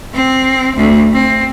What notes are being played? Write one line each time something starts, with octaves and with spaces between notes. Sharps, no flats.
C4
D2
C4